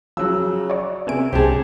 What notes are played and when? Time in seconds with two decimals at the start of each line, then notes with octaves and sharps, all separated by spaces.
0.17 C#3 F3 F#3 E6
0.70 C#5 D5
1.07 C#2 C3 B3 G#5 D7
1.32 C2 C#3 G4 G#4 C5 A5